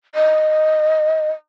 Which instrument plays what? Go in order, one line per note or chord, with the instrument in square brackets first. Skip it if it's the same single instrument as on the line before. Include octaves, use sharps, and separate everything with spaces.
[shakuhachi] D#5